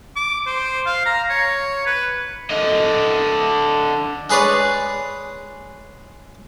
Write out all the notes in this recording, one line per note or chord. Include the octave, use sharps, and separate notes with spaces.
D6
C5
F5
A#5
C#5
B4
D3 D#5
G#3 G#4 B4 C#5 D5